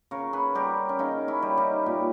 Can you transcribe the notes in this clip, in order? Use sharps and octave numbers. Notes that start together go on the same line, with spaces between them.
C#3 A#4 C#5
G#4 B4
G3 G4 A#4
C#4
C#3 D#4
C#4 E4
G3
D#4 G4
A#2